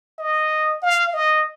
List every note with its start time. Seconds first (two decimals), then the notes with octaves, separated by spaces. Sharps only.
0.18 D#5
0.82 F5
1.13 D#5